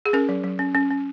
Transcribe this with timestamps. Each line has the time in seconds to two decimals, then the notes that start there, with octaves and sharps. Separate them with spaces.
0.06 G#4
0.13 C#4 A#4
0.29 F#3
0.44 F#3
0.59 C#4
0.75 C#4
0.90 C#4